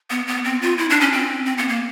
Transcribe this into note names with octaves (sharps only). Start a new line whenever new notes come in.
B3
B3
C4
F4
E4
D4
C#4
C4
C4
B3
A#3